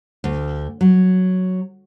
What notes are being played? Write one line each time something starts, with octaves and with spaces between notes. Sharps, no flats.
D2
F#3